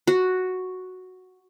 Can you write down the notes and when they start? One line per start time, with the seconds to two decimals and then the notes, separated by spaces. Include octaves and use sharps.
0.07 F#4